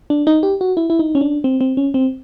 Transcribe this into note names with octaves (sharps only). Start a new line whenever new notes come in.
D4
D#4
G4
F#4
E4
E4
D#4
C#4
D4
C4
C4
C#4
C4